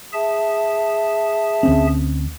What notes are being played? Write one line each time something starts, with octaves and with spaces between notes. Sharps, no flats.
G#4 E5 A5
D2 C4 C#4